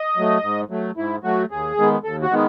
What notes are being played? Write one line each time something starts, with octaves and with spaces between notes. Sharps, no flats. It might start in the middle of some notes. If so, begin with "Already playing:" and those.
Already playing: D#5
F#3 A3
G#2
F#3 A3
G#2 E4
F#3 A3 F#4
D#2 G#4
D#3 G#3 B3
D#2 A4
F#4
D#3 G#3 B3